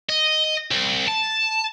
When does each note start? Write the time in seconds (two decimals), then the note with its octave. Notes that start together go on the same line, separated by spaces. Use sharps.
0.10 D#5
0.71 C2
1.07 A5